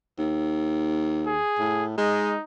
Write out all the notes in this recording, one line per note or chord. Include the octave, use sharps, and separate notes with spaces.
D#2
G#4
A2
G#3 D#4